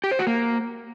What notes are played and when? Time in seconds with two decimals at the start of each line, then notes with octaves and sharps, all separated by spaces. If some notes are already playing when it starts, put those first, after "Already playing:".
0.04 G4
0.11 C5
0.19 F#4
0.27 A#3